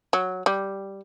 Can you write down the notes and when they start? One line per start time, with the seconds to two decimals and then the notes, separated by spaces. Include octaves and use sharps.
0.13 F#3
0.46 G3